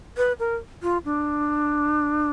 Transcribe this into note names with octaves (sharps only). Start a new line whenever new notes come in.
B4
A#4
F4
D4